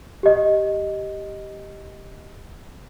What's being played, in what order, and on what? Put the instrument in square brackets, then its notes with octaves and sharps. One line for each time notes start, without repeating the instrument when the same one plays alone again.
[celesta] G4 D#5